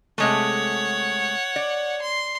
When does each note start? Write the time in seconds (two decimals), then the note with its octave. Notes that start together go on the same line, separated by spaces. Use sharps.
0.18 C3 G#3 A3 C#5 F#5
1.56 D5
2.01 C6